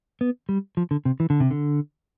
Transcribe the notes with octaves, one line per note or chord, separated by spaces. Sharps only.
B3
G3
F3
D3
C3
E3
D3
C3
D3